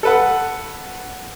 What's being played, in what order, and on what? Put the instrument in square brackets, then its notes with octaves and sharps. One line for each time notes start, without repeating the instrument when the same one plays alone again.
[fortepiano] A4 B4 F#5